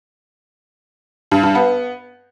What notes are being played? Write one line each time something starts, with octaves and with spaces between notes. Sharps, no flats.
G2
G2
B3